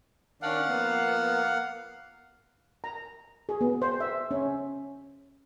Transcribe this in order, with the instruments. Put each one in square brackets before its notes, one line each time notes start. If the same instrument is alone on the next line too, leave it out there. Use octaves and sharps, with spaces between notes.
[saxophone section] D#3 C#4 D4 [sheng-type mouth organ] F5 F#5
[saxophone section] F3 A#3 B3
[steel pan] A#5
G#4
B3
C5
E5
C#4